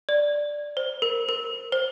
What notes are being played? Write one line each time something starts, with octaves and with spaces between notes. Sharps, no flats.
D5
C5
A#4
A#4
C5